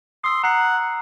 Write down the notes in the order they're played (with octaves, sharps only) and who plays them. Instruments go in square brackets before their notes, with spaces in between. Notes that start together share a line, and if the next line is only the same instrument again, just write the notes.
[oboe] C6 [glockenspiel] D#6 E6 C7
[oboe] F#5 [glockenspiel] A#5 C7